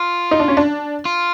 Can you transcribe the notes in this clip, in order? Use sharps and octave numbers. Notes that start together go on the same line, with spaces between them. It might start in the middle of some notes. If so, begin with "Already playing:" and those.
Already playing: F4
D#4
D4
C#4
D4
F4